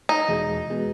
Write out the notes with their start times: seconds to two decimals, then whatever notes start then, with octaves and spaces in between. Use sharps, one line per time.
0.09 D#4
0.29 E2 B2 G#3
0.70 B2 G#3